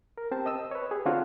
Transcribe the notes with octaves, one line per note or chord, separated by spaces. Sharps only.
A#4
C4 G4 C5 A5
D#5 D#6 E6
B4 C#5
G4 G#4
D3 C4 D4 F4 F#4 C#5